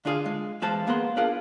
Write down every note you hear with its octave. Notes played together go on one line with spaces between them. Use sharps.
D3 D4 F4 G#4 D5 F5
G#3
E2 G#3 B4 C5 F5 A5
A#3 B3 G#4 A#4 F#5 C6
D4 F4 G#4 A#4 B4